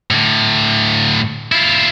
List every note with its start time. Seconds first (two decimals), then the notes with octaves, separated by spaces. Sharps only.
0.10 A2 D3
1.52 E4 F4